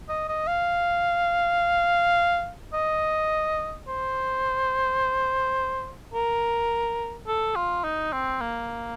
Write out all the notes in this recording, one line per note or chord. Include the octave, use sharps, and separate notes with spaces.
D#5
D#5
F5
D#5
C5
A#4
A4
F4
D#4
C4
A#3